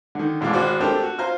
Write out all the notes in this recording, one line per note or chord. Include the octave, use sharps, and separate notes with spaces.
D3 D#3
A1 G#2 B2 E3 F5 D6
G#1 F#4 C5 D5 F6
A3 C4 D4 G4 A4 A#4
F#4
F4 C5 A#5 F6